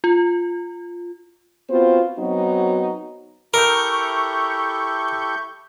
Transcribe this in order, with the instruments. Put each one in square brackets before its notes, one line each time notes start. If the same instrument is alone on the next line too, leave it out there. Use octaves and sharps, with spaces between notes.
[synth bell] F4
[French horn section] B3 C4 F4 F#4 C5
F#3 B3 C4 D#4 F#4
[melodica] E4 G4 A4 [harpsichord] A#4 [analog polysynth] C#6 G6